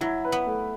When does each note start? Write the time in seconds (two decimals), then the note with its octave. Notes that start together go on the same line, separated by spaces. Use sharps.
0.01 F#3 E4
0.24 B4
0.32 B3
0.47 A3